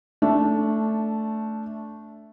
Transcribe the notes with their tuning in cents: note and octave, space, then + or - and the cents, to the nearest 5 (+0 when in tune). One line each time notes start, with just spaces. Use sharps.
A3 +0 D4 -15